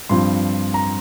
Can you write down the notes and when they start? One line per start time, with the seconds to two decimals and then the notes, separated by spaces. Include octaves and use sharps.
0.09 G2 F3 C4 C6
0.74 A#5